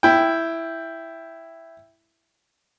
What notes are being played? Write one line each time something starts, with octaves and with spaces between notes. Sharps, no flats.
E4 G5